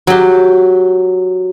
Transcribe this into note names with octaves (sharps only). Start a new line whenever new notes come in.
F#3 G4